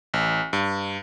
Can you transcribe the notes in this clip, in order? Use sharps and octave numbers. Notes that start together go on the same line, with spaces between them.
A1
G2